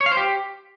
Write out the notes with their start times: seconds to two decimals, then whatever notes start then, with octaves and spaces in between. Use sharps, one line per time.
0.01 C#5
0.06 F5
0.12 C5
0.17 G4